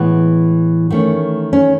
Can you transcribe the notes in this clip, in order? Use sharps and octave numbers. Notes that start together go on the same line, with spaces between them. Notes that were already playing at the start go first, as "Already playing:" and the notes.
Already playing: A2 E3 G#3 B3
D#3 A3 C#4
C#4